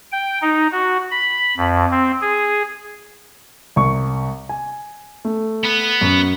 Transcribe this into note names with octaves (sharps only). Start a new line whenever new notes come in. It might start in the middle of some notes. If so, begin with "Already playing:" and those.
G5
D#4
F#4
B5
F2
C4
G#4
C2 C#6
G#5
A3
B3
F#2